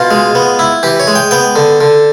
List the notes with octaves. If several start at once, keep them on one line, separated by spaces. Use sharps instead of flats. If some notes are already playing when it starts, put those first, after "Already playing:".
Already playing: B2 F4
G#3
B3
E4
E3 G4
C#5
G#3
G5
B3 G5
D3
D3